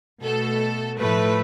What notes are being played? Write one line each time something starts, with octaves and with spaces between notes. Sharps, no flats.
B2 A3 A4
A2 F3 A3 B4